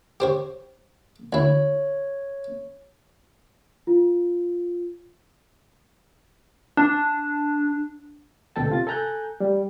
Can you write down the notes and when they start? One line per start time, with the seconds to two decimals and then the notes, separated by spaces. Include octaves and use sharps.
0.20 G4 C5 C#5
1.33 D2 E4 C#5
3.87 F4
6.77 D4
8.56 D2 B2 A4 G5 A5
8.69 C3 F4 A6
8.87 A4 G#5 A#5 F#6 G6
9.40 G3